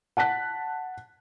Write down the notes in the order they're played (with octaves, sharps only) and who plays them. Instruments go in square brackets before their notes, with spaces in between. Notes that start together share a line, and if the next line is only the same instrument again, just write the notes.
[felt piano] F#5 A5 F#6 B6